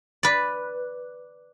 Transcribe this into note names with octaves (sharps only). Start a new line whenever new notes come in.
B4 D5